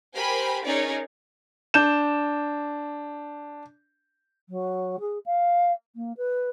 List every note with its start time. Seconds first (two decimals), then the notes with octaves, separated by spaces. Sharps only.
0.15 G4 A#4 C5 G#5 B5
0.65 C#4 D#4 G#4 A#4 C#5 D5
1.74 D4 G6 E7
4.49 F#3
5.00 G#4
5.26 F5
5.95 A#3
6.17 B4